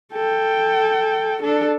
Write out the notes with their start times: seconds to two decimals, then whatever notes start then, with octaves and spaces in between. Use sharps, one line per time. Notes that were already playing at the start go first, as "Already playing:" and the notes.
0.13 A4 G5
1.43 D4 A4